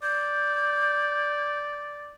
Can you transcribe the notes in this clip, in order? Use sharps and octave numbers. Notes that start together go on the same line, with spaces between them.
D5 G6